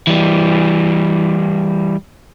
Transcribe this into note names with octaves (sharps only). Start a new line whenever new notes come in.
E3 G3